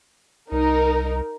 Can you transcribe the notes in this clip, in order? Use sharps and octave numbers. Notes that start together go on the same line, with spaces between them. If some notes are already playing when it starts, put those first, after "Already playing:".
C2 D#4 A#4